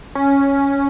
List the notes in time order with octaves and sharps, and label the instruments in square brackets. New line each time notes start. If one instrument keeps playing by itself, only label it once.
[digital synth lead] C#4